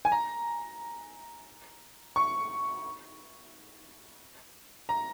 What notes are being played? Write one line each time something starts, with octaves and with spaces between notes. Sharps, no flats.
G#5
A#5
C#6
A#5